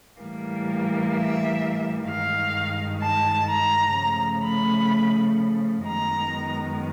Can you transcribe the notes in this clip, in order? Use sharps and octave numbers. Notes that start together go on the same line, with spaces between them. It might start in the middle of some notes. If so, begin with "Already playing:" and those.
A2 E3 G3 A#3
E5
G2 D#3 G#3 F5
A5
A#5
C#3 F3 A3
B5
F#2 D#3 G#3 B3 A#5